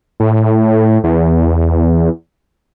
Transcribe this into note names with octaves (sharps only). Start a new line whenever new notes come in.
A2
E2